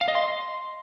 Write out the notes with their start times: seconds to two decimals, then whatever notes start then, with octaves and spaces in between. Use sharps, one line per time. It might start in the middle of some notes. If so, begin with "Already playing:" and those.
0.01 F5
0.08 D#5
0.15 C6